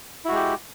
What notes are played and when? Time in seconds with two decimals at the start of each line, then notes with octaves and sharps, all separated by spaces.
0.25 E4
0.28 F#4
0.32 G#3
0.35 G4